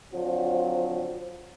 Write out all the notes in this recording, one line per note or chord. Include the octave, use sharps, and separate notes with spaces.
D3 F3 F#3 C4